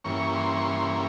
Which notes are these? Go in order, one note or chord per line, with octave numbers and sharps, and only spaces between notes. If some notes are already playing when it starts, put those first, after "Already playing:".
G2 E3 A#3 C#4 C#6
C6
C#6
C6